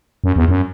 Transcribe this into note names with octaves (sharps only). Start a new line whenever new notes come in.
F#2
E2
F#2